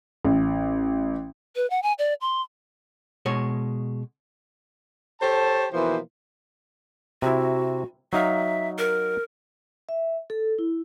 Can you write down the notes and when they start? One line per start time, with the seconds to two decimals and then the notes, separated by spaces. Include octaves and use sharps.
0.25 A1
1.56 B4
1.70 F#5
1.83 G#5
1.99 D5
2.21 C6
3.26 B2 G#3 C#5
5.21 G4 A4 C5 C#5 A5
5.72 B2 E3 F3 A#3 C5 C6
7.22 C3 E4 F#4
8.13 F#3 D#4 E5 F5
8.79 A#4
9.89 E5
10.30 A4
10.59 E4